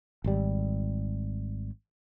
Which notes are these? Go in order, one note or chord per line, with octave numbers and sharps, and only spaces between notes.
G#1 G3